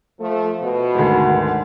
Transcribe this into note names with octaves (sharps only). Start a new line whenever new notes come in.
F3 A3
B2
G#1 D2